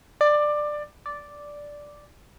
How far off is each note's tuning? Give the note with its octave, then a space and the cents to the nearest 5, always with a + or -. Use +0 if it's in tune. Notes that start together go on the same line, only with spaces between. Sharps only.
D5 +15
D5 -5